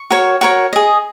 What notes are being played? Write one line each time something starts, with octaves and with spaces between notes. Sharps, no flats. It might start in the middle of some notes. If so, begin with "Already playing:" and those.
Already playing: C#6
F#4 A#4 C#5
F#4 A#4 C#5
G#4 D#5